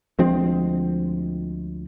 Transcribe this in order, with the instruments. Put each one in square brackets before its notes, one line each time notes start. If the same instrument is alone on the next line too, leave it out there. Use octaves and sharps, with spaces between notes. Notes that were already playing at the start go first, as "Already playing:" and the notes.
[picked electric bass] D2 F3 G#3 C4